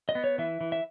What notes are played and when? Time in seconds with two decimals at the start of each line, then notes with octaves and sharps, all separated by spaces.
0.09 D#5
0.15 B3
0.24 C#5
0.38 E3 E5
0.61 E3
0.72 E5